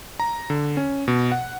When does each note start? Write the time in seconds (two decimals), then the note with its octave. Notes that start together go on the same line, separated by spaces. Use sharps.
0.20 A#5
0.50 D3
0.77 C#4
1.08 B2
1.32 F#5